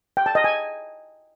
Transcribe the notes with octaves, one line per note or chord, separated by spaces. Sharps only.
G5
A5
D#5
G#5